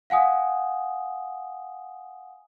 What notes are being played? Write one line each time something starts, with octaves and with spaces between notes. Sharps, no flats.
F5 F#5 G#5 D#6